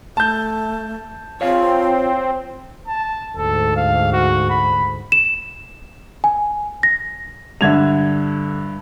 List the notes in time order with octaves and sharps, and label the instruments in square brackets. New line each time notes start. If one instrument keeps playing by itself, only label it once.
[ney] A3 [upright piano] A5 G6
[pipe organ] C4 [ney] F4 [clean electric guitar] C#5 F5
[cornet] A5
[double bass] D2 G#2 [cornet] A4
[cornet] F5
F#4
B5
[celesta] E7
G#5
A#6
[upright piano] G2 E5 [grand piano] D3 G#6 F7